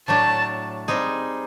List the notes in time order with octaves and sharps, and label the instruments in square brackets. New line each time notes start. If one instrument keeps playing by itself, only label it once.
[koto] A2 F#3 A3 D4 [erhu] A5
[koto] G3 C4 D#4 G#4